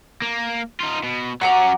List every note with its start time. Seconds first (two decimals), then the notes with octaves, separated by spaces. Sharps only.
0.22 A#3
0.80 D#4 F4
1.03 B2
1.41 F#3 C#4 F#5 A#5 D6